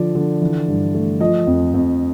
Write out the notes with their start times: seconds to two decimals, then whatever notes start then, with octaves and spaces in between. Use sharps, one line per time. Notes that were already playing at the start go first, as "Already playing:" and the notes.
Already playing: D3 F3 D5
0.15 D3
0.41 E3
0.68 G2
0.94 A3
1.20 F3 D#5
1.47 F2
1.74 F2